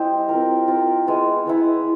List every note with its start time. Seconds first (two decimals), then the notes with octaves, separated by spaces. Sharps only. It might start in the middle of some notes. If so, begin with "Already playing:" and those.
Already playing: G3 E4 G4 C5 D#5
0.29 C4 F4 A#4
0.68 C4 F4 A#4
1.07 G#3 B3 E4
1.46 G#3 B3 E4